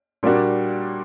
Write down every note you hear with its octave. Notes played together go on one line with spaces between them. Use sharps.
A#2 G3 A#3 D4 F#4